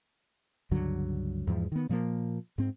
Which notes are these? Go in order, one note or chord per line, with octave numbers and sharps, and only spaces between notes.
C#2 G2 D3 F#3
E2 G#2 F3
D#3 B3
A#2 F3 G#3 A#3
G#2 C4